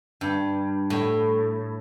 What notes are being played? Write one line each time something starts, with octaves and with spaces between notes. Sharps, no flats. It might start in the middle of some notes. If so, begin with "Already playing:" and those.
G2
A2